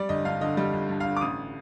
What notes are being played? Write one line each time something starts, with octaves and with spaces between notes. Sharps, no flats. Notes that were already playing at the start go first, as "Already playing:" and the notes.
Already playing: G3 D5
G1 D#5
G2 F5
D3 D#5
G3 D#5
G1
G2
F5
D3
D6
A1 D#6